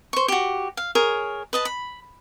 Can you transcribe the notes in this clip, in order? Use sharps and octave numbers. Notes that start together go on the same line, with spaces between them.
C5 C#6
F#4 G4
F5
G#4 A#4 C#5
B4 D#5 A5
B5